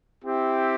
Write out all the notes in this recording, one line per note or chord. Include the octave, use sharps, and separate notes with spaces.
C4 E4 G4